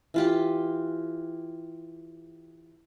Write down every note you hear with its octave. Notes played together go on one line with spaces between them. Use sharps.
E3 F4 G4